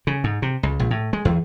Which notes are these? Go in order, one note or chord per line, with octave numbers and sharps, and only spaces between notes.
C#3
G#2
C3
C#2
A#1
A2
G#3
E2